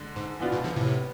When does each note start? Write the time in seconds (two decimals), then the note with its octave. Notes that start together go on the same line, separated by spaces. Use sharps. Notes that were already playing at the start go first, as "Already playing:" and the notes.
Already playing: D3 G#3
0.16 G#2
0.40 E3 B3 D4 F4
0.52 G#2 B2
0.64 D3 F3
0.76 A2 C3